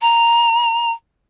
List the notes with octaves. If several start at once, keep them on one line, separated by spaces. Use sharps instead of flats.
A#5